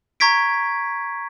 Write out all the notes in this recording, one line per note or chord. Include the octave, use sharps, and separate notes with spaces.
A#5 C#6 G#6 B6 D7